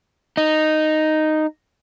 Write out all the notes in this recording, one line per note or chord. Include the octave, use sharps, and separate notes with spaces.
D#4